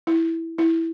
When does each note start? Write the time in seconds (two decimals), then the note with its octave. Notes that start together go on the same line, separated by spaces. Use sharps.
0.07 E4
0.58 E4